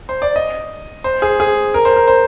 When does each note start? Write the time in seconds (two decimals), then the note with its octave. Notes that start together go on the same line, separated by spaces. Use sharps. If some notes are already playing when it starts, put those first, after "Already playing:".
0.09 C5
0.22 D5
0.36 D#5
1.04 C5
1.22 G#4
1.40 G#4
1.74 A#4
1.85 C5
1.97 A#4
2.08 C5